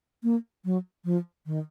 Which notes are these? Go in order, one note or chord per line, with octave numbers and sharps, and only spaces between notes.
A#3
F#3
F3
D#3